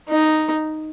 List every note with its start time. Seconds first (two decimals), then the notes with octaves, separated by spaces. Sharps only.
0.09 D#4